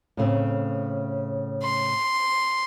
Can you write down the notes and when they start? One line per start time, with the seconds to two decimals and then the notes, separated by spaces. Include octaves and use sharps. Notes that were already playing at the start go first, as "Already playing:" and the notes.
0.17 A2 C#3 C4
1.63 C6